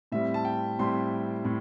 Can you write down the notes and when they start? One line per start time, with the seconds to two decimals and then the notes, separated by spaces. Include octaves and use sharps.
0.12 A2 G3 C4 E5
0.34 A5
0.45 G5
0.79 A2 G3 C4 C6
1.45 A2